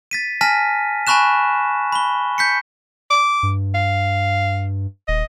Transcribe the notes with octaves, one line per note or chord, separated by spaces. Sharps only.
A6 B6 D#7
G#5 A5 F6 A#6 B6 D#7
G#5 A5 B5 C#6 F#6 E7
B5 G7
G6 B6 C#7
D6
G2
F5
D#1 D#5